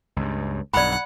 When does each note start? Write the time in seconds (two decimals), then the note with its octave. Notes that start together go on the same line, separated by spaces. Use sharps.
0.16 C#2 G2
0.74 B1 G2 D5 F#5 B5